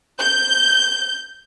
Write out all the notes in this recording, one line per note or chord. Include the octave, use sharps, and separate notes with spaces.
G6